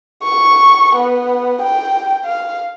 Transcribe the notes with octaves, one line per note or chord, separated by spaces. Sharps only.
C#6
B3
G5
F5